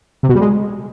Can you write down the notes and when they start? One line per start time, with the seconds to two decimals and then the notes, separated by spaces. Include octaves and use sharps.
0.23 C3
0.29 B2
0.35 G3
0.41 G#3